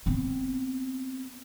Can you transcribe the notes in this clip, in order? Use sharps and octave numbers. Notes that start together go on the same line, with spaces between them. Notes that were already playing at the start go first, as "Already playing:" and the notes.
B3 C4